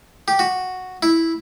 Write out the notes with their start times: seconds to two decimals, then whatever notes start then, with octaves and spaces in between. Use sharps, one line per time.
0.28 G4
0.39 F#4
1.03 E4